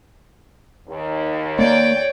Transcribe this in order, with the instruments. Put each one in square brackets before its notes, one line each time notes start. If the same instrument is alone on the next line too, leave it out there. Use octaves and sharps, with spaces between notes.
[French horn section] D#2
[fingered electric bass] A#3 [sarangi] C#5 [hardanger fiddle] D5 G5